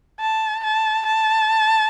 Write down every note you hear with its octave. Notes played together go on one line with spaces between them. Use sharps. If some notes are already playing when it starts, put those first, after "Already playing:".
A5
A5
A5